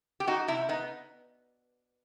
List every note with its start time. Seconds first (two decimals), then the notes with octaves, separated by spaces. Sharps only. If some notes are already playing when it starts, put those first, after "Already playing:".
0.20 G4
0.27 D#4 F#4
0.48 C3 E4
0.69 B3 D#4